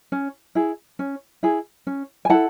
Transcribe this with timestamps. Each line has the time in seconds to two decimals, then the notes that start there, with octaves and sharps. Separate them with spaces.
0.12 C#4
0.55 E4 G#4
0.99 C#4
1.43 E4 G#4
1.87 C#4
2.25 G#5
2.29 E4 A4 F#5 A5